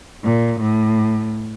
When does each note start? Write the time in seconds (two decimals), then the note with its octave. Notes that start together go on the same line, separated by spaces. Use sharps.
0.25 A#2
0.61 A2